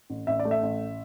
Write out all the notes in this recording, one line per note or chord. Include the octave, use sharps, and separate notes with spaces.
A1
A1 E5
D5
A3
E5
A1